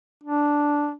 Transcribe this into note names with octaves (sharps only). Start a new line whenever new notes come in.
D4